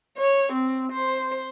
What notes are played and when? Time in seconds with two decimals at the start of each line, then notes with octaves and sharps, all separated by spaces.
0.18 C#5
0.53 C4
0.92 C5